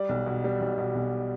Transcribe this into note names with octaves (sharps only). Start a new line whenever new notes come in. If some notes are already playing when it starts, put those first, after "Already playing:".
Already playing: G3 D5
B1
B2
G3
B1
B2
B1